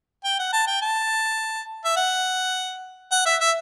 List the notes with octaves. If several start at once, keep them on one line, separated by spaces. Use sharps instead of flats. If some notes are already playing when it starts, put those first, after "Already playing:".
G5
F#5
A5
G5
A5
E5
F#5
F#5
E5
E5